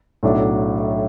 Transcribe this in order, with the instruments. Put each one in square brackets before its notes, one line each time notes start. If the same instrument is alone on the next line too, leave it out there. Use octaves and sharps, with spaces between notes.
[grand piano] B1 A2 F#3 A3 D4